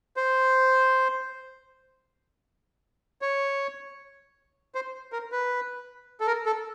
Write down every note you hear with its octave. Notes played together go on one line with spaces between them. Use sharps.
C5
C#5
C5
A#4
B4
A4
A#4
A4